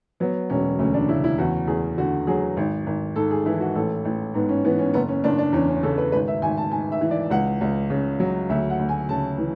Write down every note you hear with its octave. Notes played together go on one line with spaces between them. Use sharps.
F#3 B3
E1 C#4
D2 C#4
D4
C#3 E4
E4
E2 F#4
E2 G#4
D3 F#4
F#3 G#4
G#1
G#1
G#2 A4
G#4
E3 E4
F#4
A1 A4
A1
G#2 B3
C#4
E3 B3
C#4
F#1 B3
C#4
F#1 D4
D4
E2 C#4
C#4
C#3 A4
B4
G#1 B4
E5
G#1 G#5
A5
G#2 G#5
E5
E3
D5
C#2 F#5
C#2
C#3
F#3
D2 E5
F#5
D2
G#5
C#3 A5
E3